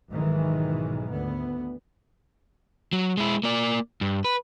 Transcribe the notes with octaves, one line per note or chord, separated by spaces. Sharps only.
B1 G#2 D#3 E3 G#3
D2 B3
F#3
G#3 E4
A#3 D5
G2
B4